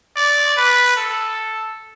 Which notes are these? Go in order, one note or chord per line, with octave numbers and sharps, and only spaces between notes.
D5
B4
A4